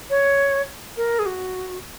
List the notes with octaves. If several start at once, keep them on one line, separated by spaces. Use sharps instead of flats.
C#5
A#4
G#4
F#4